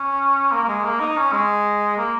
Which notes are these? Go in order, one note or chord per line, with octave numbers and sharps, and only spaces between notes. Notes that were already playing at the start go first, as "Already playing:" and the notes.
Already playing: C#4
A#3
A#3
G#3
A#3
D#4
C#4
G#3
A#3